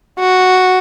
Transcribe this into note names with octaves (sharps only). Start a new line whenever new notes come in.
F#4